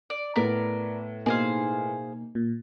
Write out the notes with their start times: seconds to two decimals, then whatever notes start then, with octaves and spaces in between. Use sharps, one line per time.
0.10 D5
0.36 A2 B3 A#4 D5 B6
1.26 B2 A#3 D#4 G#4 C5 F5
2.35 A#2